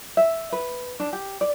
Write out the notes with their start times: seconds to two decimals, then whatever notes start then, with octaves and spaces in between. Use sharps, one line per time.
0.17 E5
0.52 B4
1.00 D4
1.13 G4
1.41 D5